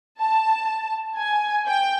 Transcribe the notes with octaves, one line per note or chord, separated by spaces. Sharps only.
A5
G#5
G5